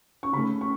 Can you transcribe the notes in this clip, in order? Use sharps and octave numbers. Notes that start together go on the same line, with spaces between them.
C#6
C#3 A3 B5
C#6